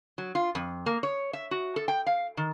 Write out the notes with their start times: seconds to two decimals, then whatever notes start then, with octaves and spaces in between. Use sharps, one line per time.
0.18 F#3
0.35 F4
0.55 F2
0.86 A#3
1.03 C#5
1.33 E5
1.51 F#4
1.76 A4
1.88 G5
2.06 F5
2.37 D#3